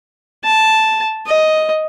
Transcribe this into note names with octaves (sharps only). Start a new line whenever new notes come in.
A5
D#5